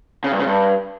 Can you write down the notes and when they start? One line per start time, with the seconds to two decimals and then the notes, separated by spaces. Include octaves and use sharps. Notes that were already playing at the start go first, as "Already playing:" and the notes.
0.24 C#3
0.32 G2
0.39 C#3
0.47 G2